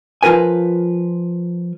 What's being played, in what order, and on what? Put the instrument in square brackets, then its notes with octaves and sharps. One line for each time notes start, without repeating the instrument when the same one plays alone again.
[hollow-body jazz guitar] F3 F4 A#4 B4 G#5